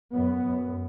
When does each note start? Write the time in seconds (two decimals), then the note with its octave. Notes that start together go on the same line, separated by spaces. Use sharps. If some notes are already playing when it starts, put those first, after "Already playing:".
0.13 F#2 B3
0.45 F#2